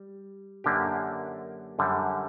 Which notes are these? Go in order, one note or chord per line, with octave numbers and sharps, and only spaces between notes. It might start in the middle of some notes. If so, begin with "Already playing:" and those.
Already playing: G3
F#2 D3 A#3 D4 G4
F#2 D3 G3